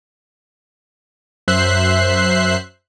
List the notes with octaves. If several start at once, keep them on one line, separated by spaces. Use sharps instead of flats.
F#2 C5 E5 F#6 C7